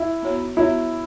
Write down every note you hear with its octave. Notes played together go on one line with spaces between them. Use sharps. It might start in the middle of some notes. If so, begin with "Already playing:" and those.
Already playing: E4
B3 F#4 C#5
B3 E4 F#4 C#5